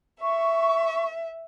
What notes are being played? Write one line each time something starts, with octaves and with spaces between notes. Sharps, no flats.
E5 C#6